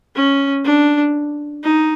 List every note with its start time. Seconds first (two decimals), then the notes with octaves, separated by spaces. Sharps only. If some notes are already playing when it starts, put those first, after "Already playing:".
0.15 C#4
0.65 D4
1.64 D#4